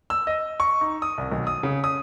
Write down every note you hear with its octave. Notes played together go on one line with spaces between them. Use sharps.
E6
D#5
C#6
D#4
D#6
C2
B1
D#6
C#3
D#6